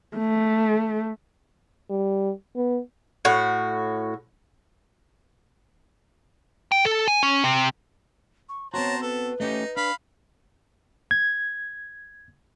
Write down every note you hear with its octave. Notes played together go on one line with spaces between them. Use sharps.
A3
G3
B3
A2 F#4
G5
A4
G#5
C#4
C3
C#6
B3 C4 F#4 C5 C#5 A5 A#5
A4 B4
A3 C#4 D#4 G4
D4 F5 B5
G#6